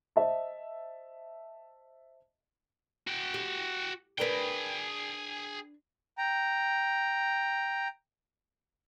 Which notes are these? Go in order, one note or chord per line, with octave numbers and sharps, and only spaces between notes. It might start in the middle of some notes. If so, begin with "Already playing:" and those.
C5 D#5 E5 A5
F#4 G5
G4
D4 G#4 A#4 B4 G5
G5 A#5